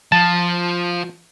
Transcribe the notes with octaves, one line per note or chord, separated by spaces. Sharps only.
F3 A5